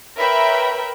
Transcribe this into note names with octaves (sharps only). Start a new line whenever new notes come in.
A#4 B4 C#5 E5 G5 B5